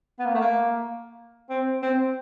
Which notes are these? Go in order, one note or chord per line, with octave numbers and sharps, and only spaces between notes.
B3
A#3
A3
A#3
C4
C4